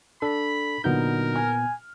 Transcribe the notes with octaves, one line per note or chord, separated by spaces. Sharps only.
D4 A4 B5
A#2 D3 F#3 B3 D#4 A#4 G6
G#5 F6